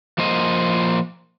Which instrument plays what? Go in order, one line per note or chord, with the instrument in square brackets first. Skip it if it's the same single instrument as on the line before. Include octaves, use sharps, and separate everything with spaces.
[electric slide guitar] F3 A#3 C5 D#5